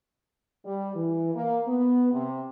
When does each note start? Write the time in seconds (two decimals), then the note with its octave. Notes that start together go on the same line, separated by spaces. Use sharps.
0.65 G3
0.95 E3
1.35 A#3
1.67 B3
2.13 C3